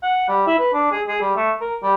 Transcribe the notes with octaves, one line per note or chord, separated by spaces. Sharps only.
F#5
G3
E4
B4
D4
G#4
G#4
G3
A3
A#4
G3